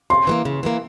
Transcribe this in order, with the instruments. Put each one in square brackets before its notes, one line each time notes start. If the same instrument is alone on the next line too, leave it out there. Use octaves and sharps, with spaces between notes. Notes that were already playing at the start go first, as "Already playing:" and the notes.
[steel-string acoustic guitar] C#3 [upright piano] C6
[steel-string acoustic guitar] E3 G3 A#3
C#3
E3 G3 A#3